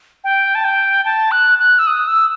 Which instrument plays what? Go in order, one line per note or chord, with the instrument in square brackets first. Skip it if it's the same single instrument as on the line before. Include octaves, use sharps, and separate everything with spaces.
[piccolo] G5
A5
G5
A5
F#6
F#6
E6
D#6
E6